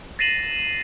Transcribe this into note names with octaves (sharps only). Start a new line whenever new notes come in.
A6 A#6 C7 D#7 E7 F#7